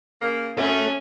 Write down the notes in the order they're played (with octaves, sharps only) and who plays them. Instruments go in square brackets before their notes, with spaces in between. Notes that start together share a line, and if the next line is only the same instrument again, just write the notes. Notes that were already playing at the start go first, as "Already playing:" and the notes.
[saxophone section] C#3 A#3
[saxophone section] F#2 [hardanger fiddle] C#4 [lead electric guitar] A4 E5